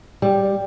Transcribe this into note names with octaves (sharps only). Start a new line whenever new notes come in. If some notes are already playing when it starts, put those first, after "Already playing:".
G3